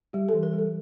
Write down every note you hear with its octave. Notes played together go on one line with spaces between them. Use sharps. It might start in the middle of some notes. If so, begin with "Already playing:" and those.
G3 G4
A4
E3
A#4
G3
A4